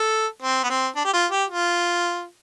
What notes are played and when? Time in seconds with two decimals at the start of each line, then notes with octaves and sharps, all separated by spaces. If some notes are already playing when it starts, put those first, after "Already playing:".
Already playing: A4
0.42 C4
0.64 B3
0.69 C4
0.96 D4
1.05 G4
1.13 F4
1.31 G4
1.50 F4